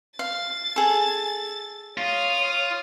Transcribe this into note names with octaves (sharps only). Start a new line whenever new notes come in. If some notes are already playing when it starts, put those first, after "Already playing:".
F5 A6
G#4 A4
F4 C#5 D#6